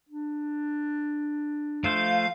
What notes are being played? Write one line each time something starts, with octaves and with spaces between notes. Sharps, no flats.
D4
F3 A3 C5 F5